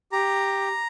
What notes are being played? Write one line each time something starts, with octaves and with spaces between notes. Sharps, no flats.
G4 A#5